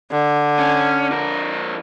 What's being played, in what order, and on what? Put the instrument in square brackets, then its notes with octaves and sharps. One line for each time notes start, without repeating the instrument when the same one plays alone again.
[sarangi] D3
[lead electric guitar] C#4
F2 A#4